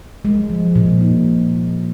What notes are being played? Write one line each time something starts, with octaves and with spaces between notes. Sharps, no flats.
G#3
F3
A#2
D#4